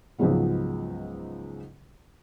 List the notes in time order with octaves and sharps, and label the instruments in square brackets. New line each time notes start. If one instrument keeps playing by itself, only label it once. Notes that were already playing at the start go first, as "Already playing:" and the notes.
[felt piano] C#2 G#2 F3 F#3 G#3 B3